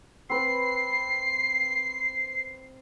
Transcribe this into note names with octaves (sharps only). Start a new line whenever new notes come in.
C4 B4 C7